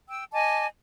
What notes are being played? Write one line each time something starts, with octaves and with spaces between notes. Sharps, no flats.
G5 E6
D#5 G#5 A5 D6